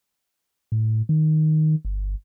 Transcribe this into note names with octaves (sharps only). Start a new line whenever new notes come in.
A2
D#3
G1